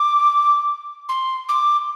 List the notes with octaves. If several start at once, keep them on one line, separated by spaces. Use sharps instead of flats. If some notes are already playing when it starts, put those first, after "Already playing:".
Already playing: D6
C6
D6